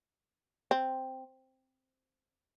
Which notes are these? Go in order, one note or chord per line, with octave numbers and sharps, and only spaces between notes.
C4